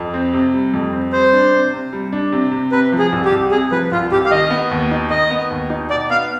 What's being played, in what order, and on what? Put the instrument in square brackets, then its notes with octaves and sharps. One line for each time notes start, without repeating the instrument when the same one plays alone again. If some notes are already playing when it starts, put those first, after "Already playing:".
Already playing: [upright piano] F2
C4
C3
G3
F2
C4
[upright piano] G3 [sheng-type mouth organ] C5
[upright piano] D4
C3
C3
G3
D4
C3
C3
[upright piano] C3 [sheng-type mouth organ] B4
[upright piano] F3
[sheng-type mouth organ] G#4
[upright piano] C2
[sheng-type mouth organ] G4
[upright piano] C2
[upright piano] C3 [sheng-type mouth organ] G#4
[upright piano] F3 [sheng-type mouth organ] B4
[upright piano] C2 [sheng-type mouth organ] F4
[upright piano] C2 [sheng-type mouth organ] G4
[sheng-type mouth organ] F5
[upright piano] D#3 [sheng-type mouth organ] D#5
[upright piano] B3
D#2
D#4
[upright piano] D#3 [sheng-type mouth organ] D#5
[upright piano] B3
D#2
D#4
[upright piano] B2 [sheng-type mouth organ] D5
[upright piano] B3 [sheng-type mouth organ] F5